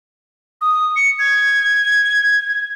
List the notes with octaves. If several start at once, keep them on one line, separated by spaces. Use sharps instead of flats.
D#6
C#7
G#6